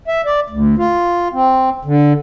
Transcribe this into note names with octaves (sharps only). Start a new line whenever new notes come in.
E5
D5
D2
F4
C4
D3